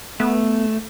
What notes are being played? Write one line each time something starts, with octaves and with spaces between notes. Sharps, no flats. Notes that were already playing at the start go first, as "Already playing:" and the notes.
A3 B3